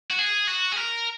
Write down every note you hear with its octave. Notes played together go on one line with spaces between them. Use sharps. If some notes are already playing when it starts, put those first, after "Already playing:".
F#4
G#4
F#4
G#4
A#4